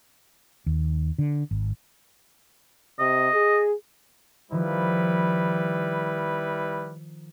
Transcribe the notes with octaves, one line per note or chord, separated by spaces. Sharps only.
D#2
D3
G#1
C3 D#5
G#4
D#3 F3 G3 E4 B4